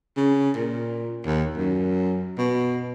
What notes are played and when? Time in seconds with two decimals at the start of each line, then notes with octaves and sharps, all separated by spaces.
0.17 C#3
0.56 A#2
1.26 D#2
1.57 F#2
2.38 B2